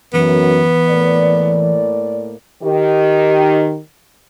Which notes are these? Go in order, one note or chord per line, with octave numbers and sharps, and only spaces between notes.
F#2 E3 B3
A2 A#3 D5
D#3 G4